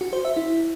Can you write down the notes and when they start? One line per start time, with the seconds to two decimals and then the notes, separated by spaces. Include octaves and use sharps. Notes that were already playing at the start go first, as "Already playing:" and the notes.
0.01 F#4
0.13 C5
0.25 E5
0.37 E4